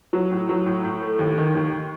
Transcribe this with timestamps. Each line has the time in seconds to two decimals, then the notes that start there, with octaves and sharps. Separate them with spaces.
0.13 F#3
0.31 A2
0.49 F#3
0.66 A2
0.84 A2
1.02 A3
1.19 D#2
1.38 D#3
1.55 D#2